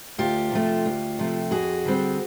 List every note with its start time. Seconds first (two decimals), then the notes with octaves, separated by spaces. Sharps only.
0.18 D2 F4 G4
0.52 C3 F3 A3
0.86 D2
1.19 C3 F3 A3
1.51 F2 F#4 G#4
1.85 D3 G3 C4